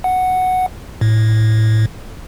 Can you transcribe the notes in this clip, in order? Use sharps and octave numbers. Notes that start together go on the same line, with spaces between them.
F#5
A2